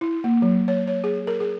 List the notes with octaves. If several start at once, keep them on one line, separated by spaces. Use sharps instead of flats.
E4
A#3
F#3
C#5
C#5
G#4
A#4
G#4